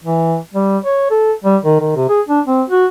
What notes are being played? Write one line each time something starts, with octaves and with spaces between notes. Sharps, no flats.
E3
G3
C#5
A4
G3
D#3
D#3
C3
G#4
D4
C4
F#4